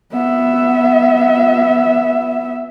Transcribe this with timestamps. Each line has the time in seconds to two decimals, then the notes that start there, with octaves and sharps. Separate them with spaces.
0.13 B3 E5